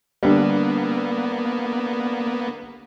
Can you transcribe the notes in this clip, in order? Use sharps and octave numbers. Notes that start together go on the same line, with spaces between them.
D3 G3 A#3 B3